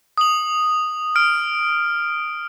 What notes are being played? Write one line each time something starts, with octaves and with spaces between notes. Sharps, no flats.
D#6 F#7
F6 D7